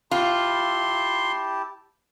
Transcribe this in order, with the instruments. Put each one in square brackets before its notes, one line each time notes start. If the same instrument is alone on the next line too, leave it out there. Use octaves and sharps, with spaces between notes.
[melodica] E4 G4 A5 [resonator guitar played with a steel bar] F4 [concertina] C6